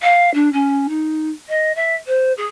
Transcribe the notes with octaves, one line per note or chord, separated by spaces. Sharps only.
F5
D4
C#4
D#4
D#5
E5
C5
G#4